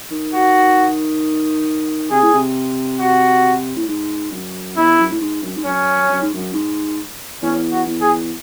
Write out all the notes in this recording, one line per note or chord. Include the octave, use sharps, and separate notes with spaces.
D#3
F#4
C3 G#4
A2
C3
F#4
A2
G#2
F#2
E2 E4
F#2
A2
G#2
F#2
G#2
F#2 C#4
F#2
G#2
F#2
G#2
E2 C#4
F#4
E2
G#4